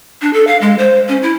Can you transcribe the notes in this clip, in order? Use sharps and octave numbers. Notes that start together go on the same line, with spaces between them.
D4
A4
F5
G#3
C5
C#4
E4